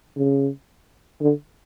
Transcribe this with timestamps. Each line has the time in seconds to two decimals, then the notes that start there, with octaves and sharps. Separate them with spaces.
0.17 C#3
1.21 D3